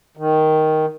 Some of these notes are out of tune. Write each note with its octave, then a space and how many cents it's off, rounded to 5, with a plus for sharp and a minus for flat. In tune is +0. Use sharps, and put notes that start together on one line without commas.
D#3 +5